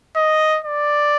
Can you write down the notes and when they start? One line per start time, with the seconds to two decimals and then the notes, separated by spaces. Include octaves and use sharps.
0.16 D#5
0.64 D5